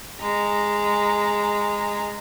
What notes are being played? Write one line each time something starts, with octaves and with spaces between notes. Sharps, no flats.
G#3 A#5